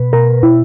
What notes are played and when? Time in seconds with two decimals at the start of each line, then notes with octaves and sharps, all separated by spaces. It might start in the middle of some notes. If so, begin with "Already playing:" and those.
Already playing: B2 B4
0.13 B2 A#4
0.43 B2 E4